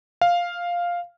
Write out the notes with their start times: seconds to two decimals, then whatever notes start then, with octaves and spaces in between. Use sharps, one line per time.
0.21 F5